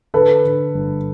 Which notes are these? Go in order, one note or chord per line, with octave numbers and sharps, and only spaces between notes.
D3 A4 B4
D3
G1